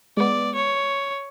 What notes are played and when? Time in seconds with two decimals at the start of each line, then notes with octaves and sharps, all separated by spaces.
0.17 G#3 B3 D5
0.55 C#5